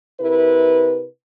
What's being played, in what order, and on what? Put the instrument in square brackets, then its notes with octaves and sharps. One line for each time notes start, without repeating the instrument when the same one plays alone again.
[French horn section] C3 E4 A#4 B4